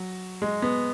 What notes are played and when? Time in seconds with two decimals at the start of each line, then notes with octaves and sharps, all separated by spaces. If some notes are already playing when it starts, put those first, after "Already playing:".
Already playing: F#3
0.42 G#3
0.62 B3